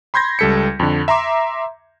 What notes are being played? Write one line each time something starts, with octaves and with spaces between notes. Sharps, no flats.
B5 C6 G6 G#6 A#6
C#2 G3 A4 B6 C#7
F2 D3
E5 A#5 C6 D6